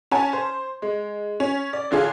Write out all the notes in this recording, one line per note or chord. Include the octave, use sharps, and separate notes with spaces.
C#4 G#5 A5
C5
G#3
C#4
D5
A1 D3 F4 G#4